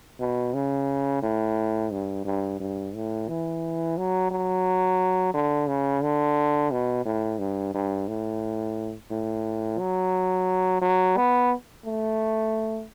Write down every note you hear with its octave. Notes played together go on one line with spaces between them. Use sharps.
B2
C#3
A2
G2
G2
G2
A2
E3
F#3
F#3
D3
C#3
D3
B2
A2
G2
G2
A2
A2
F#3
F#3
B3
A3